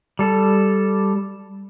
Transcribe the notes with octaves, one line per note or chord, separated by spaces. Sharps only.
G3 A4